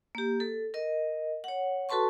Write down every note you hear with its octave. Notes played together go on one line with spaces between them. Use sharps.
A#3 G4
A4
A#4 D#5
C#5 F#5
F#4 A4 B4 A5 C6 C#6